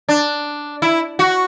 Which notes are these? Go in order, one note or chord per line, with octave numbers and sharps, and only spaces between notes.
D4
E4
F#4